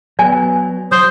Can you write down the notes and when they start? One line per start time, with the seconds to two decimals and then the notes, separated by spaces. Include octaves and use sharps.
0.19 F#3 B3 D5 G#5
0.92 F#3 C5 D#6